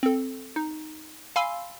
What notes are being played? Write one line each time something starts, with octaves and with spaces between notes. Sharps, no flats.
C4 A4
D#4
F5 G#5 B5 C6 E6